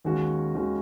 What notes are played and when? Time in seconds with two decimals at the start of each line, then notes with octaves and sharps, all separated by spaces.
0.04 D#2 D#3 G#3 C#4 F#4
0.55 D#2 D#3 G#3 C#4 F#4